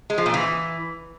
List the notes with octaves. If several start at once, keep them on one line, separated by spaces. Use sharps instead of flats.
G#3
F3
A#2
E3